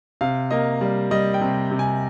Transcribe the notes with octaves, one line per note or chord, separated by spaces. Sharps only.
C3 F5
A#3 D#5
G3
G3 D#5
G5
C3
C3
G#5